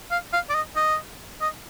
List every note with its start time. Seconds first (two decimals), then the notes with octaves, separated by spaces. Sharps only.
0.11 F5
0.33 F5
0.50 D5
0.55 D#5
0.76 D#5
1.41 D#5